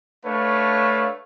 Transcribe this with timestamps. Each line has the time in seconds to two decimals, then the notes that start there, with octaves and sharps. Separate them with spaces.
0.25 A3 D4 B4 C#5 F5